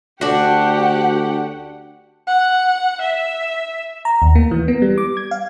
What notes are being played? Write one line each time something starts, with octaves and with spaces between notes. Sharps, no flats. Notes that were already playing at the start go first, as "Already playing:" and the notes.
D2 D4 F#4 G4 F#5
F#5
E5
A#5
D#2
A#3
E3
B3
G3
D6
G#6
F5